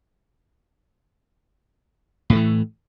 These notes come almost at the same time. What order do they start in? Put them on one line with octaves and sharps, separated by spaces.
A2 A3 E3